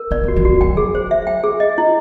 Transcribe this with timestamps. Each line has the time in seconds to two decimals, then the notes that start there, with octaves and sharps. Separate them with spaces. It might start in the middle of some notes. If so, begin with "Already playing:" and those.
Already playing: A#4
0.11 D3 D5
0.24 D#3
0.28 F#4
0.36 E3
0.45 F3 F#4
0.61 F#3 G5
0.77 G#4
0.95 C5
1.11 E5
1.27 G5
1.44 G#4
1.60 D#5
1.78 E4